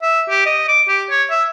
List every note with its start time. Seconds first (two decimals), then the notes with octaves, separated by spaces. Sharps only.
0.02 E5
0.29 G4
0.46 D#5
0.68 D6
0.89 G4
1.10 C#5
1.31 E5